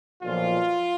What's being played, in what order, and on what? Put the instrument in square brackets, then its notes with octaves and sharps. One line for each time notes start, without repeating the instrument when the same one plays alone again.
[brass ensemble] B1 A#2 F3 F4